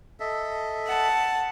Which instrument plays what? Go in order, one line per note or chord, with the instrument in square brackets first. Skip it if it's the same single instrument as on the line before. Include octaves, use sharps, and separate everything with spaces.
[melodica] A4 D#5 E5
[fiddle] F#5 A5